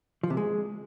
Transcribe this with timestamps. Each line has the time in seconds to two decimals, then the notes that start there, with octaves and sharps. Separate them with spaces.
0.23 F3
0.30 C3
0.37 G#3